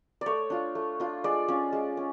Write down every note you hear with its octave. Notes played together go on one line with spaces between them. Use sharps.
A3 C#5 D5
D4 F4
A3
D4 F4
G#3 D5
C#4 F4
G#3
C#4